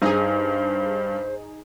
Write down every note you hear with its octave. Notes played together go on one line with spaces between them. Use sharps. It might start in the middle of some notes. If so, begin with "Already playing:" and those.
G2 D#4 G#4 C5